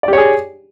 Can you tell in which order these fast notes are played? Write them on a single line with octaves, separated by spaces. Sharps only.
D5 G4 C#5 G#4